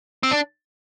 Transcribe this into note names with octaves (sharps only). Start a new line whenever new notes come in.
C4
D4